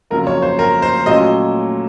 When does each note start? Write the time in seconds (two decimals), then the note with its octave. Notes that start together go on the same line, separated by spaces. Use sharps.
0.10 F2 C#3 F#3 A#3 A#4
0.27 C#5
0.42 C5
0.59 A#4
0.82 C5
1.06 A#2 F#3 A3 C#4 D#5